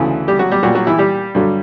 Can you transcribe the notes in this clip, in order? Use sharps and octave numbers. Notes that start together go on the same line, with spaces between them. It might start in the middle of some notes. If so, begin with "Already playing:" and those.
Already playing: D2 C#3 E3
G3 G4
F#3 F#4
G3 G4
A#2 F#3 G3 F#4
F#3 F#4
E3 E4
G3 G4
G2 D3 F#3